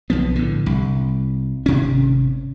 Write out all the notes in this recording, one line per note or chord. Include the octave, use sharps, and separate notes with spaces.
B1 F3 B3
A2 D3
C2
G#1 C3 C#4